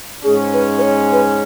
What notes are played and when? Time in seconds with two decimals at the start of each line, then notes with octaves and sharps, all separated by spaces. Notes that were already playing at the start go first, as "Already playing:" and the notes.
0.23 G#2 G#3 C#4 G#4
0.53 B4
0.78 B4
0.82 C#5
1.12 B4